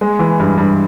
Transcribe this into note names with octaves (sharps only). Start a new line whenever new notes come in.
G#3
E3
G2
G2